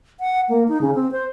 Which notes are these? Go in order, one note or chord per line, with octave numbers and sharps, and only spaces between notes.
F#5
A#3
D#4
C#3
C4
C5